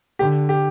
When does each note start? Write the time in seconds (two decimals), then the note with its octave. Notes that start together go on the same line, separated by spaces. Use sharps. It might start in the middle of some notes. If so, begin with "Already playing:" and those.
0.19 D3 G4
0.49 G4